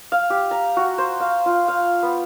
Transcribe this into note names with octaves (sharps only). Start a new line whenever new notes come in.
F5
G4
A#5
F#4
C5
F5
F4
F5
B3